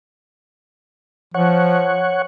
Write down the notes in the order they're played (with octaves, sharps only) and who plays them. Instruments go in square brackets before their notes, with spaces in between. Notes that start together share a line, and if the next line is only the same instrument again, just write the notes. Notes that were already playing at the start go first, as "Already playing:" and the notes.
[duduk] F3 [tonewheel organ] C#5 F#5